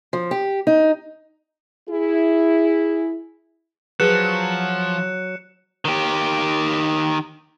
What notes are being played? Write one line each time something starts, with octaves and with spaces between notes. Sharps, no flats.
F3
G4
D#4
E4 G#4
F3 F#3 G#4 B4 F#6 C#7 E7
D#3 G4